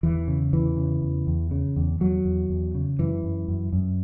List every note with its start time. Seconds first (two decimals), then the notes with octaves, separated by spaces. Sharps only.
0.03 E2 E3
0.28 C#3
0.53 E2 E3
0.77 C#3
1.02 E2
1.27 E2
1.51 C#3
1.76 E2
2.00 E2 F#3
2.25 E2
2.49 E2
2.75 C#3
2.99 F#2 E3
3.24 F#2
3.48 F#2
3.73 F#2